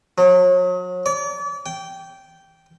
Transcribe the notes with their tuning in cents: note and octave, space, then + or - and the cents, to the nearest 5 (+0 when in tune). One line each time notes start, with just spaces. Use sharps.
F#3 -35
D5 -35
G5 -10